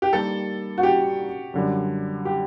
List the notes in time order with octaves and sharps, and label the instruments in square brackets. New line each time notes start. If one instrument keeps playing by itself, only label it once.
[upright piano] G4
[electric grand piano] D#3 G3 A#3 [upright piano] A4
[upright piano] F#4
G4
[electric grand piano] F#2 D3 G3
[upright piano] G4